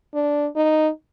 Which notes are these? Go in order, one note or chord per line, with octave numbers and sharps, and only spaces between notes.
D4
D#4